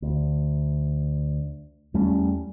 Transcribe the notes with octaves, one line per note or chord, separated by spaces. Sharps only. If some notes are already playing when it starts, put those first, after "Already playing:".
D2
E2 G3 A3 C#4